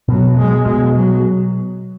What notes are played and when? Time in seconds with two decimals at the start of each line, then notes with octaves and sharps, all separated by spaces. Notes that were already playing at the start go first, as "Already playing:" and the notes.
0.08 B2 F#3
0.38 G#3
0.66 B2 G#3
0.96 F#3